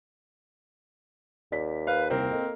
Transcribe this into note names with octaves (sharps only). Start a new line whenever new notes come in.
D#2 D5 B6
B4 F5
C2 A#3 C4
A4 D#5